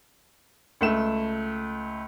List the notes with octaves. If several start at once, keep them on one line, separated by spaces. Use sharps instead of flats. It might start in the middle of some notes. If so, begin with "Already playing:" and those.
C#2 A3 E7